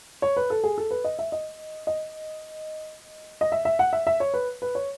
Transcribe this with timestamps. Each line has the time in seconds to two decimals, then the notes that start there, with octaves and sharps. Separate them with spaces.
0.22 C#5
0.37 B4
0.50 A4
0.64 G#4
0.78 A4
0.91 B4
1.04 D#5
1.19 E5
1.32 D#5
1.87 D#5
3.41 D#5
3.52 E5
3.65 E5
3.79 F#5
3.93 E5
4.07 E5
4.20 C#5
4.34 B4
4.62 B4
4.75 C#5